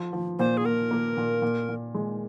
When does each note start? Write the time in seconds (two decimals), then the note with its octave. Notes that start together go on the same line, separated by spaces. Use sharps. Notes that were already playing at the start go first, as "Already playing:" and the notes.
Already playing: F3
0.13 F3
0.39 A#2 C5
0.57 G#4
0.65 A#2 A#4
0.91 A#3
1.17 A#2
1.42 A#2
1.69 A#2
1.94 G#3